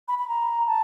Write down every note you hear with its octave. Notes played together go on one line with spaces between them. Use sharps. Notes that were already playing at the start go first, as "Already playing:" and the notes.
B5
B5
A#5
A5